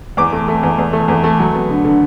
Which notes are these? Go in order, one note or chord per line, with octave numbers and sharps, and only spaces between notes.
E2 D6
A3
A3
E2
E2
A3
E2
A3
F#3
B3
D3
D3